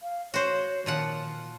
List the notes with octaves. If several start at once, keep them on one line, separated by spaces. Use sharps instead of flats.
F5
F#4 C5 C#5
A#2 D#3 F3 F#5